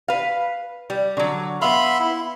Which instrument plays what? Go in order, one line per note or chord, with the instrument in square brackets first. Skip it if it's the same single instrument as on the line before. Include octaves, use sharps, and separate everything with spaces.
[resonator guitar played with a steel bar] B4 F5
G3
D3 F#3
[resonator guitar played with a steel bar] B3 F5 [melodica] E5 B5 C6
[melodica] E4